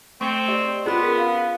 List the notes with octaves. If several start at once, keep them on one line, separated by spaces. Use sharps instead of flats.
A3 C4 G5 C#6 C#7
G4 D5 D#5
B3 C#4 F4 G#4 B5 C6
A#4
F5 F#5